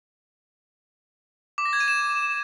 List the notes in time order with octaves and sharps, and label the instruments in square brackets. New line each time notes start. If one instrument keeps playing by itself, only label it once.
[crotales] D6
A#6
G#6
D#7
E7